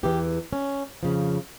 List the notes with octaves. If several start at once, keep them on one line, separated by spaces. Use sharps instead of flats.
E2 E3 G4
C#4
F2 C#3 F3